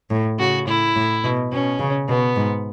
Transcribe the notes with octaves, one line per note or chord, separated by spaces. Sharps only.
A2
C#3 F#4
A2 E4
A2
B2
B2 C#4
C#3
B2 B3
G#2